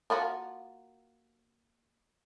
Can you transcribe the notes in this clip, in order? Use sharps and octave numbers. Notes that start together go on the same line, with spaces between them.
A#3 F4 F#4